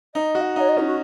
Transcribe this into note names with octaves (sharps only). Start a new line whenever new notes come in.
D#4 D#5
F#4
F#5
D#4 C#5
D#5
C#4 D#4
F#4